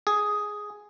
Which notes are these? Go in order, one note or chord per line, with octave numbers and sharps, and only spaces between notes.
G#4